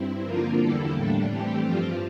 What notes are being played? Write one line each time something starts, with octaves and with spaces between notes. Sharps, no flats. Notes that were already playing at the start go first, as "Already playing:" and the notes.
Already playing: G2 C4 E4
D3 F3 A#3 F4 A#4
E2 D3 G3 A#3 E4 A4
A2 G3 D4
E3 A3 C4 G4
G2 F3 C4 F4